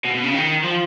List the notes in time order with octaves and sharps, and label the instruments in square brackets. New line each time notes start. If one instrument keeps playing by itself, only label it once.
[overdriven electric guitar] B2
B2
C#3
D#3
F3